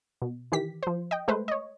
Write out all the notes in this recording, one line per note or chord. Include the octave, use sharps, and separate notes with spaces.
B2
D#3 E3 G4 B6
F3 C5
D#5 G5
G#3 A3 B4 C5
C#5 D#5